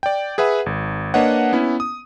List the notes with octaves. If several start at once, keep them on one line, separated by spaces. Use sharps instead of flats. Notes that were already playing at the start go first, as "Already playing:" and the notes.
D5 G5
G#4 B4 E5 F#5 B5
G#1
A#3 D4 B4 C#5 D#5 F#5
B3 C#4 E4
D#6